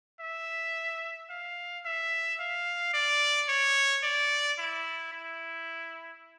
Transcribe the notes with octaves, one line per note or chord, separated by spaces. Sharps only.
E5
F5
E5
F5
D5
C#5
D5
E4
E4